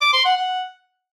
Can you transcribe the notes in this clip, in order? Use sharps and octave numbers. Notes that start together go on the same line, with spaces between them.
D6
C6
F#5
F#5